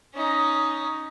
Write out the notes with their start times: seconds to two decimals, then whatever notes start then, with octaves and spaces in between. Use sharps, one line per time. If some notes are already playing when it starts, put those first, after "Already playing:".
0.14 C#4 D#4